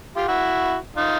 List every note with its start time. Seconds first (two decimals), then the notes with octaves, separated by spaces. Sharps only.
0.16 F4 G4
0.28 E4 F#4
0.97 D#4 F4